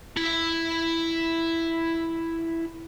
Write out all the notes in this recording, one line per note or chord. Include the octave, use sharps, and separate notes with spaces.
E4 B5